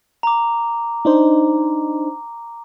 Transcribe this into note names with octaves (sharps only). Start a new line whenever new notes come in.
A#5 D6
D4 D#4 C5